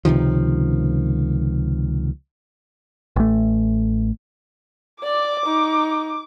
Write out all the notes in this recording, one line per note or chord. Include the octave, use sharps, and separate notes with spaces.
C#2 C3 D#3 F3
A1 A3
D5 D6
D#4